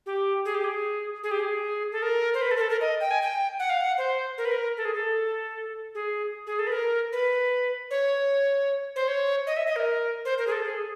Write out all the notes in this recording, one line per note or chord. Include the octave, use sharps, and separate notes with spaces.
G4
G#4
G4
G#4
G#4
G4
G#4
A4
A#4
C5
B4
A4
A#4
A4
A#4
D#5
G5
G#5
G5
F#5
F5
F#5
C5
A#4
B4
A#4
A4
G#4
A4
G#4
G#4
A4
B4
A#4
B4
C#5
C5
C#5
D#5
E5
D#5
A#4
C5
A#4
G#4
A4
G#4